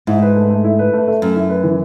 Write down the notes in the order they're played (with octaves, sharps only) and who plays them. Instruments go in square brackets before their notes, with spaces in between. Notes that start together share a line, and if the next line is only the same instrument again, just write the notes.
[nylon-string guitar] G#2 [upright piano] E4
[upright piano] B4
A3
A3
E4
B4
A3
A3
[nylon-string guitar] F#2 [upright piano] A3
[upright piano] E4
B4
E3